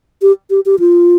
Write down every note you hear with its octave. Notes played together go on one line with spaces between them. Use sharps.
G4
G4
G4
F4